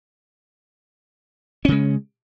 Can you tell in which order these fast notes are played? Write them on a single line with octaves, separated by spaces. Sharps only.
C#4 C#3 G#3